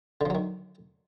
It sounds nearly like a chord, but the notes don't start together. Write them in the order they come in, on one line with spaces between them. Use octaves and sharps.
D3 F3 F#3 D#3